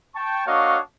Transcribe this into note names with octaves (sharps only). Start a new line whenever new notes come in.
G5 A5 C#6
A#3 D4 F#4 C#5 D#5 F5